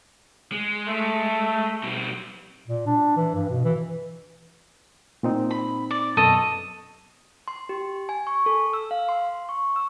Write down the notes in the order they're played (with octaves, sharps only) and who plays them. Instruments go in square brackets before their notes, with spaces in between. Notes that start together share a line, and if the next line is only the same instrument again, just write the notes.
[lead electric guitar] G#3
[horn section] A3
[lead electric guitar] B2 G3
[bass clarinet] A#2
D4
E3
G2
B2
E3
[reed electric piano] A#2 C4 D#4
[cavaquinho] B5
D5
[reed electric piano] F#2 B2 C#6 [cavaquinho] A4 D#5
[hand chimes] C6
G4
G#5
C#6
A4
E6
F5
C6
C#6
E6